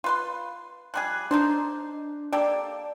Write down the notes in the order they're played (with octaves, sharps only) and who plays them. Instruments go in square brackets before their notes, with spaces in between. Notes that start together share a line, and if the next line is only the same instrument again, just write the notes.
[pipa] F4 B4 C6
[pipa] F3 G3 G#4 [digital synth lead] F#6
[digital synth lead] D4 [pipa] D#4 A4 C5
[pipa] A#3 G4 A4 [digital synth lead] D5